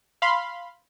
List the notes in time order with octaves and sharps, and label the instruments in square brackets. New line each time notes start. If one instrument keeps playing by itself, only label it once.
[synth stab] F5 B5 C6